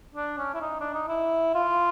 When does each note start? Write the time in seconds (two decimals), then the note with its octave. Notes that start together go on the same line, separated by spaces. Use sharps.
0.15 D4
0.38 C#4
0.54 E4
0.61 D#4
0.80 D4
0.94 D#4
1.08 E4
1.55 F4